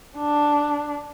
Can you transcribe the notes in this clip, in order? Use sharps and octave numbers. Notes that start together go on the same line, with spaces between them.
D4